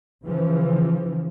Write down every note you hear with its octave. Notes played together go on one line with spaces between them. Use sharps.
C#3 E3 F3